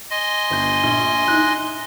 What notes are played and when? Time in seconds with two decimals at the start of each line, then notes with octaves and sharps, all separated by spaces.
0.11 D#5 G#5 C6
0.50 G1 G6
0.84 A#1
1.28 D#4 E4 F#6